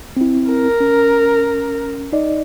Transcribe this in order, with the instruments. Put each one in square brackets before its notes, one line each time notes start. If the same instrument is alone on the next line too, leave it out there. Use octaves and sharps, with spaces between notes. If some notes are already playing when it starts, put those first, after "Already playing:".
[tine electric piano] C4 E4
[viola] A#4
[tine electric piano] C#4
D#4 D5 D#5